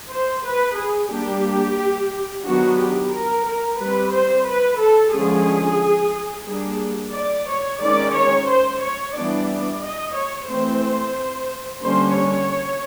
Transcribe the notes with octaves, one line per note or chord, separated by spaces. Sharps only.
C5
B4
G#4
G3 A#3 D4 G4
D#3 F#3 B3 D4 F#4
G4
A#4
A#4
G3 C4 B4
C5
B4
A4
D3 F3 G#3 C#4 G#4
G3 A#3 D4 G#4
D5
C#5
D#3 G#3 C#4 D5
C#5
C5
C#5
E3 G3 B3 D4 D5
D#5
C#5
E3 A3 C4 C5
D3 G3 A#3 C#4 C5
C#5